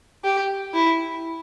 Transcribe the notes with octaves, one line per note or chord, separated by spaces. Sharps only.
G4
E4